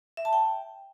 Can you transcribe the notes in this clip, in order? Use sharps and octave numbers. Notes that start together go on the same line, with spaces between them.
E5
A5
G5